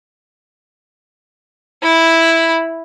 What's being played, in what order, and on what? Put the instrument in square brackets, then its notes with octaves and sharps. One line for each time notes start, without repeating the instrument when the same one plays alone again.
[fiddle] E4 B5